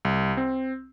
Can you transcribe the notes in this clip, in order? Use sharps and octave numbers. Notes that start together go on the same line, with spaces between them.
C2
C4